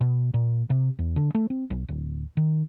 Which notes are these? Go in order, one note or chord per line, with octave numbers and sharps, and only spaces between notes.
B2
A#2
C3
E2
D3
A3
C4
B1
D1
D#3